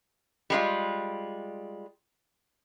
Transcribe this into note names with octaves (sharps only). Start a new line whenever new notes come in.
G3 G#3 F4